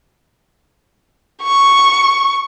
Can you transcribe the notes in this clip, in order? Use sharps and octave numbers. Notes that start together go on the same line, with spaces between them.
C#6